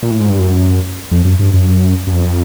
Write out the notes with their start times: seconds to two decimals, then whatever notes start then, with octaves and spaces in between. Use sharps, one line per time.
0.03 A#2
0.11 A2
0.20 G#2
0.29 G2
0.39 F#2
1.11 F2
1.25 F#2
1.39 G2
1.54 F#2
2.07 F#2
2.12 F2